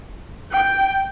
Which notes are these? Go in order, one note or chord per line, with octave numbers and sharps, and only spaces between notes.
G5